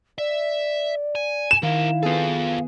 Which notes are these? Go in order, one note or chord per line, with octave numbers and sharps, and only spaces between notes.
D5 E5
G#5
E7
D#3 C4 E4 A#4 F5
B3 F4 G#4 A4